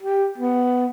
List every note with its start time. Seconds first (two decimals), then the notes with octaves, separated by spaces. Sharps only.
0.02 G4
0.38 B3